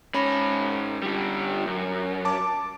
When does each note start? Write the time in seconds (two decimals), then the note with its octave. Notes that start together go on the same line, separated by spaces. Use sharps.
0.14 G#2 C#4 B5
1.03 D3 G3
1.66 F#2
2.25 A5 D6